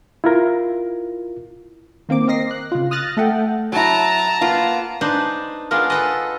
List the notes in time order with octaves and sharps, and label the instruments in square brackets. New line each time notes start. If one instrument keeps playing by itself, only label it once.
[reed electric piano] E4 F4 A#4
[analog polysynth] D#3 A#3 C4 D6
C4 A#4 D#5 A#6 C7
F#6
C#3 F4
D#6 F6 F#6 A6 A#6
A3 A4 E5 F#5 G5
[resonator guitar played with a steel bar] F#3 E4 [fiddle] A5 A#5
[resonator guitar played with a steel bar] A#3 B3 F4
[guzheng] D4 D#4 B4 C5
G#3 B3 D4 F4 A#4
A4 B4 D#5